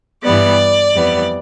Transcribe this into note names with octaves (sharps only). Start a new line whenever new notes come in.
G2 E3 G3 B3 D5
F2 E3 G3 B3